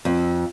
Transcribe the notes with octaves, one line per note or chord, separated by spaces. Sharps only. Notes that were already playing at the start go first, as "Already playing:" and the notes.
F2